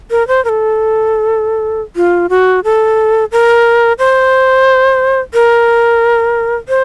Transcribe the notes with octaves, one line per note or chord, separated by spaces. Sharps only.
A#4
C5
A#4
A4
F4
F#4
A4
A#4
C5
A#4
C5